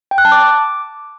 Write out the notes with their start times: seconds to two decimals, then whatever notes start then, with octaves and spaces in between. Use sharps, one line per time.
0.11 G5
0.18 F#6
0.25 A5
0.32 D6